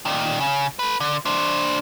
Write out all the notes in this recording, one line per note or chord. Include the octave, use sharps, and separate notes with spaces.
A#2 D#3
C#3
A4 B4
D3
D4 C5